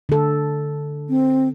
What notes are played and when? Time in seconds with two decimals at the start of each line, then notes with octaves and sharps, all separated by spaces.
0.09 D3 A4
1.09 C4